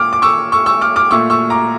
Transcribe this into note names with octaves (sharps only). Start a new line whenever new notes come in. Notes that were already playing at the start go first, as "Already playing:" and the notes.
Already playing: A#2 D6 F6
D6
C#6 E6
C#6 E6
C#6 E6
D6 F6
D6 F6
A#2 A3 C#6 E6
C#6 E6
A#5 D6